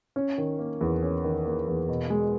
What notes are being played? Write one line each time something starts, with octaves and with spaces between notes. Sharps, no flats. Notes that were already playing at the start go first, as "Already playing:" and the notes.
C#4
D#3
A#3
E2
C#4
D#3
A#3
E2
B2
G#3